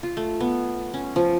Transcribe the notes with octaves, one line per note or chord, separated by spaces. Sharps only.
F4
A3
B3
C#4
F3